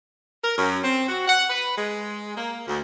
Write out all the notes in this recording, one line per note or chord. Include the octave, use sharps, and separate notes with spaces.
A#4
F#2
C4
F#4
F#5
B4
G#3
A#3
D2